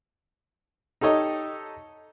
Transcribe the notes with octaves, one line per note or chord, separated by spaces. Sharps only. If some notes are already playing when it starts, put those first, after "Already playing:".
D#4 G4 A4 C#5 D#5